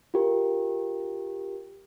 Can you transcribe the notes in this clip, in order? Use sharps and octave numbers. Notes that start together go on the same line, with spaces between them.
F4 G4 A#4